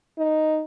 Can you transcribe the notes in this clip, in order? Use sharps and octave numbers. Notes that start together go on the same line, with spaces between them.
D#4